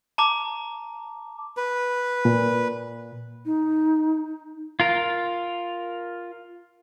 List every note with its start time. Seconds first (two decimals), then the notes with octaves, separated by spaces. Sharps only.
0.18 A5 A#5 D6
1.57 B4
2.25 A#2
3.46 D#4
4.80 F4 A#4